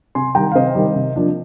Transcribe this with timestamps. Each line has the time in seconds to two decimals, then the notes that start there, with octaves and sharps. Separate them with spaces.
0.15 C3 G#5 C6
0.35 D#3 G3 G5 A#5
0.52 F5
0.55 C3 C5 D#5
0.75 D#3 G3
0.96 C3
1.16 F3 A#3 D4